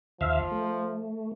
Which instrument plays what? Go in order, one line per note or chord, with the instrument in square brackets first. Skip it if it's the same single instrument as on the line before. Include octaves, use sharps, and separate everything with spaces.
[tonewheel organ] D#2 E5 F5 [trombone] F3
[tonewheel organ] A3